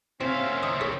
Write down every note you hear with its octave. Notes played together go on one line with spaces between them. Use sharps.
C3 C4 C#4 C5 E5 F5
F#2 A#2
D#3 E3 D#5
G#4 C#5